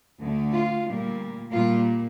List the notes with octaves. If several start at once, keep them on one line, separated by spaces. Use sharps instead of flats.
D2 D3 A3
F4
A#2 G3 A#3
A#2 G3 A#3 F4